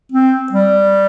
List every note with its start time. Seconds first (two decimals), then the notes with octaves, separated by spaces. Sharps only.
0.12 C4
0.52 G3